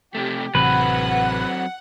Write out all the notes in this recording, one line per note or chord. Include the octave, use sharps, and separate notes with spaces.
C3 A3 G4
A1 C3 E3 F#3 C4 B4 F#5